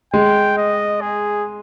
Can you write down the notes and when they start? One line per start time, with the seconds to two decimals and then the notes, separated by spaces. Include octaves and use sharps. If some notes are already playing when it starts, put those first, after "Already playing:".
0.13 G#3 G5
0.58 D#5
1.01 G#4